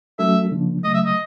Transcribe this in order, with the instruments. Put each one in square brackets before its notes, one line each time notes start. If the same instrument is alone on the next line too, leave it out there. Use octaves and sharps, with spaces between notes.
[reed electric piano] F#3 A3 C#4 F#4 A4 [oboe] E5
[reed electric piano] C#3 F3 A#3 D4
[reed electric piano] C#3 F#3 A3 [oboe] D#5
[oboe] E5
D#5